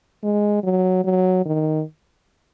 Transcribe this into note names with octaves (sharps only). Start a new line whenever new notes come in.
G#3
F#3
F#3
D#3